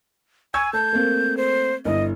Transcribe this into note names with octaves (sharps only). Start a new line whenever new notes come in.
G#5 C#6 E6 G#6
A3 A5 G6
A3 A#3 C4
C5
G1 E4 D#5